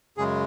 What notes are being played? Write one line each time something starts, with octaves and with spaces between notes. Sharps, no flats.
F#2 C#3 G#3 G#4